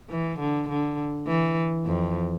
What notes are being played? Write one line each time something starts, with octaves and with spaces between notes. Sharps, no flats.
E3
D3
D3
E3
F2